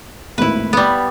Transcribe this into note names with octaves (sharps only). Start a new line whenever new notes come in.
G#1 D#2 A2 E4 B4
G3 B3